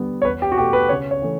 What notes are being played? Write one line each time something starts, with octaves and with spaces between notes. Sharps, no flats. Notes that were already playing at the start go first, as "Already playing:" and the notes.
Already playing: D3 G3 B3
C#5
E2 B4
G4
F#4
B2 A3 G4
B4
C#3 C#5
C#5
E3 A3